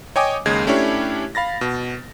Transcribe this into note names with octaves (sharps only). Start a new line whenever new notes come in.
C#5 D#5 G5 G#5 D6 D#6
D#2 C#3 G#3 G#6 C7
A3 C#4 D4 E4 G4 C#5
F5 B5 A6 A#6
B2